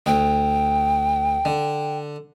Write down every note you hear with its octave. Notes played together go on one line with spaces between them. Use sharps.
D2 G5
D3